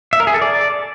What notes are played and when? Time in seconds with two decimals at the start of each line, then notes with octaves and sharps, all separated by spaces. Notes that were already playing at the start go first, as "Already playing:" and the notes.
0.13 E5
0.20 A#4
0.27 G#4
0.34 A4
0.42 D5